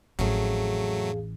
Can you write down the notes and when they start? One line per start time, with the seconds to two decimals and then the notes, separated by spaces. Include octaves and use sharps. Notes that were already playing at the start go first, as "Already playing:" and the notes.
0.19 A1 F2 F#3 A3 G#4 F5